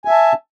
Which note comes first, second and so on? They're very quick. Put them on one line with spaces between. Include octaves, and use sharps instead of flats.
G#5 E5 A5